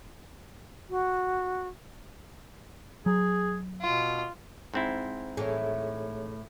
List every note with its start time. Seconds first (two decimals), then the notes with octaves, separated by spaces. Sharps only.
0.90 F#4
3.06 F#3 G#4
3.81 B2 F4
4.74 G#2 C4 E4
5.37 A2 E3 G#4 A4 C#5